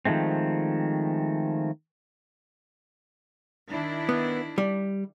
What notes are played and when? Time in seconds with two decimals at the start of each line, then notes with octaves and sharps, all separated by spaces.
0.05 D#3 F3 G#3 A3 C4
3.69 D#3 D4 E4
4.09 B3
4.58 G3